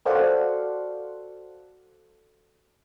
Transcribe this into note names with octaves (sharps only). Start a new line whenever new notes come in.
F#4 A4 C5 D5 F5 F#5